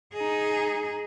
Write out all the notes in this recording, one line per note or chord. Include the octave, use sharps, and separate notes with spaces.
D#4 G#4